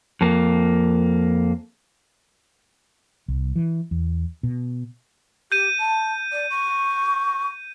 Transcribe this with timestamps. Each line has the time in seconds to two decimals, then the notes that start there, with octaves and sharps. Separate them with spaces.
0.21 F2 A#3
3.28 C2
3.56 E3
3.91 E2
4.43 B2
5.52 G4 G6 D#7
5.79 A5
6.32 D5
6.50 C#6